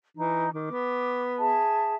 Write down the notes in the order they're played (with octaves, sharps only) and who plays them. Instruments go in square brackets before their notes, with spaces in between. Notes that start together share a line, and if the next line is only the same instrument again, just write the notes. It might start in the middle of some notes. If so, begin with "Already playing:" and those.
[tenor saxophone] E3 [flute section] D#4
[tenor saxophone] D#3 [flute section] D6
[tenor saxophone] B3
[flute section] G#4 E5 A5